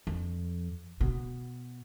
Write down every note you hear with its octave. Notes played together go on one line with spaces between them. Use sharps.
F2
B2